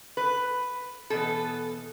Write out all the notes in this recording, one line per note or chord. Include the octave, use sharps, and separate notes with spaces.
B4
E2 B2 B3 A4